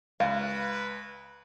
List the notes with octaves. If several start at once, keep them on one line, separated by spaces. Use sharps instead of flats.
C#2 B4 F5